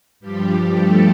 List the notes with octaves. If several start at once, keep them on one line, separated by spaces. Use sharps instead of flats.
G2 F3 G3 G4
A3 A4